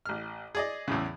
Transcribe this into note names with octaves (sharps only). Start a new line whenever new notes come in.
A1 F6
G#4 D5 D#5
E2 A2 C#3